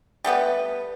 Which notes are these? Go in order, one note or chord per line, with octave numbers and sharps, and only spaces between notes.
G3 A3 B3 B4